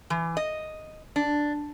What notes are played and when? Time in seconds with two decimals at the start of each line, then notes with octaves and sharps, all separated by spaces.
0.10 E3
0.37 D#5
1.16 D4